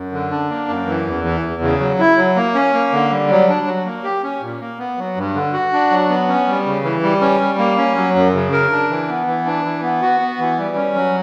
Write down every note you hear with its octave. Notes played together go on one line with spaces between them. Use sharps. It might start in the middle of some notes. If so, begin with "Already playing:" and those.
Already playing: F#2
D3
D4
A#3
F#2
E3
E2
E3
E2
C#3
F#3
E4
F#3
A#3
C#4
A#3
D3
G3
F#3
D4
F#3
A#3
G4
C#4
A#2
A#3
B3
F#3
G2
D3
F#4
D4
F#3
B3
C#4
G3
C#3
E3
G3
C#4
G3
A#3
C#4
F#3
F#2
C#3
A#4
D4
E3
B3
E3
D4
E3
B3
F#4
B3
E3
G3
C#4
F#3